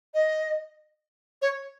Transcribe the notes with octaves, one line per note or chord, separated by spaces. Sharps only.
D#5
C#5